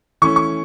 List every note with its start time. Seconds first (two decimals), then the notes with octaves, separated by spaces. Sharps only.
0.22 E3 A3 C#4 C#6
0.36 C#6